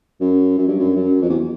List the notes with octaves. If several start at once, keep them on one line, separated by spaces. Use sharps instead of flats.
F#2
F#2
G2
F#2
F#2
F2
E2